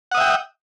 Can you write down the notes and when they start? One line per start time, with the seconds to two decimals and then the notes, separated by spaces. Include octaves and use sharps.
0.12 F#5
0.15 D#6
0.18 E5
0.21 G5